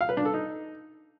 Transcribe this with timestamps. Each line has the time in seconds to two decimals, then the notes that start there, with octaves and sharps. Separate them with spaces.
0.01 F5
0.09 B4
0.17 D4
0.25 A4
0.34 D#4